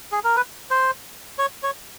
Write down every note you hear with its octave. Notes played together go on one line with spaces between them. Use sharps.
G#4
A#4
B4
C5
C#5
C#5